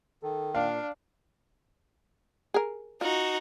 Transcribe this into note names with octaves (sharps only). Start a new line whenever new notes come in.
D#3 A4
A#2 D4 F5
G#4 A#4
D#4 F4 F#4